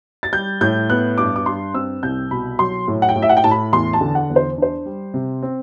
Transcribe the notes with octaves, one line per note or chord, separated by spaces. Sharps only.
A6
G3 G6
A2 G6
B3 F#6
G2 D6
D6
G2 C6
C4 E6
C2 G6
B2 B5
F#3 C6
A2
F#5
G5
A2
E5
F#5
G5
A2 A5
B5
E2 C6
A5
D3
F#5
E2
C5
D4 C5
G3
C3
C4